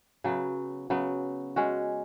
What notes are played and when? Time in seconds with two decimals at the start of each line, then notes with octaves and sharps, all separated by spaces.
0.24 C#3 F#3 B3
0.90 C#3 F#3 B3
1.56 G#3 C#4 F#4